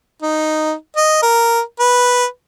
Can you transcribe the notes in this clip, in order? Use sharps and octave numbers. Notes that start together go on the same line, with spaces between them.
D#4
D#5
A#4
B4